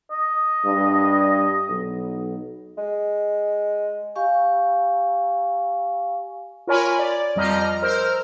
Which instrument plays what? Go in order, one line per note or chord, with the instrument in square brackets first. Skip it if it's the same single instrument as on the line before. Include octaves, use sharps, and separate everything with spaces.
[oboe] D#5
[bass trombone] G2
B1
[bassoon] G#3
[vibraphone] G4 F5 G#5 C#6
[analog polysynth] F4 A#4 C#5 G#5 B5
D5
F2 F3 G3 D#5 A#5 F6
A#4 C5 E6 F6